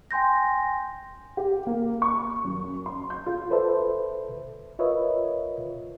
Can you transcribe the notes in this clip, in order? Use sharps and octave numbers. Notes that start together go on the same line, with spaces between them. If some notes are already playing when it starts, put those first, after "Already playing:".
G5 G#5 C6 G6 A#6
G4
A#3
C#6
F#2
C6
G6
F4
A4 B4 C5 D5 E5 A5
F4 A#4 B4 C#5 D#5 E5